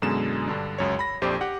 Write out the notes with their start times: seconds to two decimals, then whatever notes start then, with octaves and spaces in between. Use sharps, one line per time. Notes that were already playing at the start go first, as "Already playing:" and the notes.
0.02 F#2 B2 D3 G#3 E7
0.48 G2 D3 D4
0.78 C#2 F#2 C#5
0.99 B5 A#6
1.22 A#1 F2 G4 C5 D5
1.41 G4 F#5